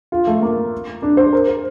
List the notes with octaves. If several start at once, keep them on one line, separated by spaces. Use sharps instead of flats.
F4
A3
A#3
D4
C5
A#4
C5